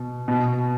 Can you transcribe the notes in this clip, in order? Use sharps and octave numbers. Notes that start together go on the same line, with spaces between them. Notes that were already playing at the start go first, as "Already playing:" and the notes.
Already playing: B2
B2